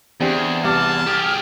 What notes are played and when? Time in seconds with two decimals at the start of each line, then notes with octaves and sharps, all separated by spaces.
0.21 E2 C4 D4 G4 G#4
0.64 C2 A5 D6 F6
1.07 G4 G#4